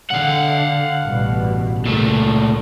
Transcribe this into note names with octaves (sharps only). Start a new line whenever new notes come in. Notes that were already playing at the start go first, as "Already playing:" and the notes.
D3 F5 F#5
A1 G2 B2
C#2 A#2 A3